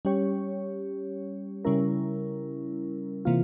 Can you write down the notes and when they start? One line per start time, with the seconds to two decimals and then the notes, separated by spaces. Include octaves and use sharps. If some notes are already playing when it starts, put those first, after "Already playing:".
0.05 G3 C#4 G4 C#5
1.65 C#3 G3 C#4 E4 A#4
3.25 C3 E3 A#3 F4